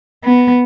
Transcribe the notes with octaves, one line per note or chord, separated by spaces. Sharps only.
B3